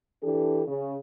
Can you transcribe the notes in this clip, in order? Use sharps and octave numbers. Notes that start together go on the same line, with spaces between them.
E3 D4 G4 A4
C#3